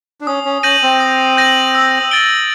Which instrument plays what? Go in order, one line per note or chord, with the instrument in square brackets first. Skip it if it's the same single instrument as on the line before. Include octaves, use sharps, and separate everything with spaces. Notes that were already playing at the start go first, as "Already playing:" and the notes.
[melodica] D4
[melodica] C#4 [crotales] D#6
[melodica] C#4
[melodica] C#4 [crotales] G6 A#6 D#7 F#7
[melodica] C4
[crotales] D#6
G6 A#6 D#7 F#7
E6
A6 D7 G7